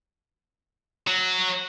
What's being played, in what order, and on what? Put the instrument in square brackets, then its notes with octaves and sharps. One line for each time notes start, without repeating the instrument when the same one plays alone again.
[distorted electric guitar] F#3 F#4